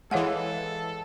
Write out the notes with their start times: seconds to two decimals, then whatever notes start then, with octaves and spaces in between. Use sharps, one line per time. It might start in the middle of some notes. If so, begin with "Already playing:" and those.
0.11 E3 G#3 A4 C#5 F5 F#5